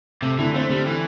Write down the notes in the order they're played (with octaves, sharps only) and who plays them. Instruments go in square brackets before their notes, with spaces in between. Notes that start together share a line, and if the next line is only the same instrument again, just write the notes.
[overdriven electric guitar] C3 [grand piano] A3
[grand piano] D3 [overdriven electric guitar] E3
[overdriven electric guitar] A3 [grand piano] C4
[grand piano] D3 [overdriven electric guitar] G3
[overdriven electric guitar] E3 [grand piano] A3